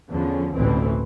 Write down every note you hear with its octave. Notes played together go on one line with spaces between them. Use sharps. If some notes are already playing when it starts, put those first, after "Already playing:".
E2 D3 F3 C#4
A1 D2 G#2 B2 E3 C4